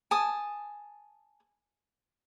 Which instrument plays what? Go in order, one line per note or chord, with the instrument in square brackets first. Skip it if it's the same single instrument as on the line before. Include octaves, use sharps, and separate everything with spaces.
[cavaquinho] G#5 A5 D#6